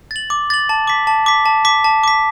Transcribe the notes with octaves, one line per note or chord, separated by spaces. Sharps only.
A6 F#7
D6
A6 F#7
A5
D6 B6
A5
D6 B6
A5
D6 B6
A5
D6 B6